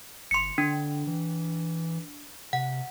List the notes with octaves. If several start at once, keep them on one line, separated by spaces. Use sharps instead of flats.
G1 C6 C#7
D3 D4
E3
C3 F#5